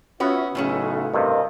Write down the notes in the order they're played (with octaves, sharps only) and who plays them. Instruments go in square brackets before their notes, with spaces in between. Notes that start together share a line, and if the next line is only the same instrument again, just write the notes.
[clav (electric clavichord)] B3 [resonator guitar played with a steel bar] C#4 F#4 [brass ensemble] F4 C#5 E5
[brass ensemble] B1 C#3 [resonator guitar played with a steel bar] A2 A3 C#4
[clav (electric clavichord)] G2 C3 [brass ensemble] A#4 D#5 F5